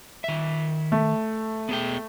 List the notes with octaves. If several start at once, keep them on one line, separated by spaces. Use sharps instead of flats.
D#3 E5
A3
B3 G#4 G5